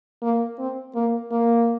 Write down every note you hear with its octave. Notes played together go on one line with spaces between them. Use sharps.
A#3
C4
A#3
A#3